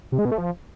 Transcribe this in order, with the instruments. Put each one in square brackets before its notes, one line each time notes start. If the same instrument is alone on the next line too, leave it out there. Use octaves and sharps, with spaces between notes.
[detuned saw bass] C3
G#3
B2
A3
F3